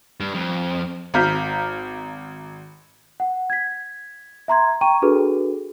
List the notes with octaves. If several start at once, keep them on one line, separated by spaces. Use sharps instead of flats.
G2
F2
G#1 F5 A#5 F6 G6 B6
F#5
G#6 B6
E5 A#5 C6 G#6
G5 A#5 C#6 D#7
D4 F#4 G#4 A4 B4